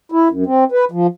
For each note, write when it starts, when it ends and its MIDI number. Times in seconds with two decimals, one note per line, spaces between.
0.12 0.28 64
0.31 0.44 42
0.46 0.64 60
0.72 0.85 71
0.91 1.07 53